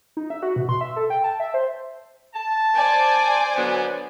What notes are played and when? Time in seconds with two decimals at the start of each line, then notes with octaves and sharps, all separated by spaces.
0.17 D#4
0.30 E5
0.43 F#4
0.56 B2
0.69 C6
0.81 E5
0.96 A4
1.10 G5
1.24 A5
1.40 E5
1.54 C5
2.35 A5
2.75 C5 D5 G#5
3.57 D3 F#3 B3